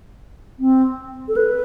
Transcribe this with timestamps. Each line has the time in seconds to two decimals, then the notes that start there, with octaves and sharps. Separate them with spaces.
0.59 C4
1.28 A4
1.36 B4